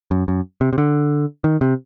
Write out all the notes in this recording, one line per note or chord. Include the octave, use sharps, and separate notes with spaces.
F#2
F#2
C3
C3
D3
D#3
C3